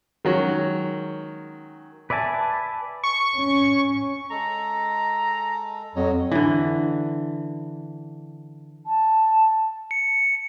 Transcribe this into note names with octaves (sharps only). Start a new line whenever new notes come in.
D#3 F#3 G#3 C#4
B4 D5 E5 G#5 A5
C#6
C#4
G#3 A4 A#5
F2 F#3 F#4 C#5 D#5
D3 E3
A5
C#7